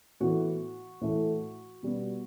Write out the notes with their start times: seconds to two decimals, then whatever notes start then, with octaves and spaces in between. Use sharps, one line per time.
0.20 A2 E3 B3 F#4
1.01 A2 E3 A3
1.83 B2 G3 B3